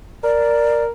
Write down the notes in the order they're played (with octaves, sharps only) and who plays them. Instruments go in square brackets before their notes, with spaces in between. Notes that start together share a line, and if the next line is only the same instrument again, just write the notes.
[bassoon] A#4 [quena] D5